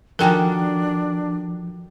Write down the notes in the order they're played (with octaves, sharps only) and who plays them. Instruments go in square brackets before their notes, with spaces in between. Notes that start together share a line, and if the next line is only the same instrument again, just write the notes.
[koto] D#3 F#4 A4 [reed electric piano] F3 [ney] D4 [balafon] A#4 G5 G#5